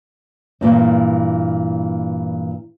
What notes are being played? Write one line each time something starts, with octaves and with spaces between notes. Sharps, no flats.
G2 A#2 E3